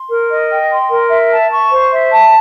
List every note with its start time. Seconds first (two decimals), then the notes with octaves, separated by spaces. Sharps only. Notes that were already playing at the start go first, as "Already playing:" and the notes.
Already playing: C6
0.11 A#4
0.31 D#5
0.51 G5
0.70 C6
0.91 A#4
1.11 E5
1.31 A5
1.51 C#6
1.71 C5
1.91 E5
2.12 A5